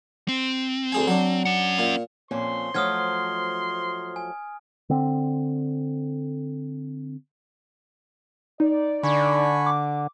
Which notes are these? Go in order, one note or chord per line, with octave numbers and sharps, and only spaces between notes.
C4
D2 G#4 G#5
F#3 D4
C#4 F#5
A#2
F2 A#2 C#4 C5 D#5 C6
F3 F#3 A3 D#6 F6 G#6
G#5
D3 C4
D#4 D5
D3 G#5 B5 C#6
D6